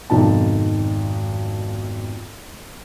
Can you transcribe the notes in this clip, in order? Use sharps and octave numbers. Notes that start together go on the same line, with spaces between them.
G#1 F2 B2 D#4 A5